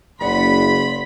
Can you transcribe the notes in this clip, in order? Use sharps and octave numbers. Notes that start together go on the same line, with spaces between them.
F#1 G#4 D5 F#5 B5 C6 B6